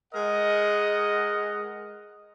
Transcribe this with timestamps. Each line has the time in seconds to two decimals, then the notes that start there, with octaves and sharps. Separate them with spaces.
0.14 G#3 A#4 D#5 F#5